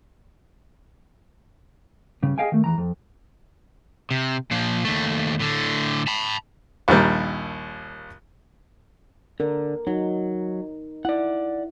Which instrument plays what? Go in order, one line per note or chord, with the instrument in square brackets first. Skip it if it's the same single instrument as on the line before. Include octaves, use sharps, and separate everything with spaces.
[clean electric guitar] G2 C#3
G#4 D#5 F5 G5 G#5
D#3 A3
E2 E3 A#5
F2
[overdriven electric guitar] C3
A#2 F3
D#2 A3
A2 D3
A5 B5
[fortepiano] A#1 D#2 G3 A#4
[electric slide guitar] D3 [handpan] A#4
[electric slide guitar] F#3 [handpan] D#4
[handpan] E4 [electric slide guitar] D5 F#5